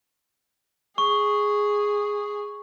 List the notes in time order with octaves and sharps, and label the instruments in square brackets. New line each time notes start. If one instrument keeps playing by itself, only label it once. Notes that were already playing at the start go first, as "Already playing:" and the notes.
[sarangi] G#4 [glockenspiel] C#6